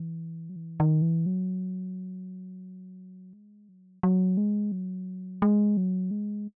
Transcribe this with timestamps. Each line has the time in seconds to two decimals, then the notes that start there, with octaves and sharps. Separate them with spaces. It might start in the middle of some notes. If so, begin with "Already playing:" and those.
Already playing: E3
0.49 F#3
0.56 E3
0.80 D#3
1.02 E3
1.26 F#3
3.33 G#3
3.69 F#3
4.03 F#3
4.37 G#3
4.72 F#3
5.42 G#3
5.77 F#3
6.11 G#3